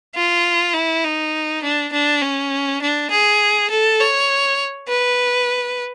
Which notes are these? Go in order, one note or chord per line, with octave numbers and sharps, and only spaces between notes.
F4
E4
D#4
D4
D4
C#4
D4
G#4
A4
C#5
B4